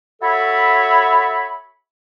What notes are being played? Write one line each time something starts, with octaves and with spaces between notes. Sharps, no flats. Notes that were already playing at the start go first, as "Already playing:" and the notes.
F#4 A4 C#5 E5 B5